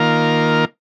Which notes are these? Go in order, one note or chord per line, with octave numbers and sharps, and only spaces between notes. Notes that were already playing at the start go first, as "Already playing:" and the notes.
Already playing: D#3 A#3 F4 A#4